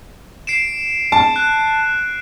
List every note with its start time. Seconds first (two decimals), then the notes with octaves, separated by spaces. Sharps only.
0.47 C7 D7 E7
1.12 A5
1.36 F#6